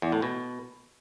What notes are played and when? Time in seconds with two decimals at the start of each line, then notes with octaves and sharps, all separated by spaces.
0.02 E2
0.12 A2
0.22 B2